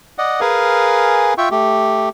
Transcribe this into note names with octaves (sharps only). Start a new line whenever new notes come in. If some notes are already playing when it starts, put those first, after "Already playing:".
D5 D#5 F#5
G#4 A#4 B4 F5 G#5
F4 E5 G5 C#6
A3 G4